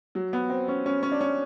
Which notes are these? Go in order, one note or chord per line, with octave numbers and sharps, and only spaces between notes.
F#3
B3
C4
C#4
C#4
C#4
D4
C#4